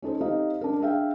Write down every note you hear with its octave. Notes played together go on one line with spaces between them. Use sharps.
C#4 D#4 A4 C5
C4 D#4 G4 D#5 F5
D4 A#4
D4 G#4 E5 F5 G5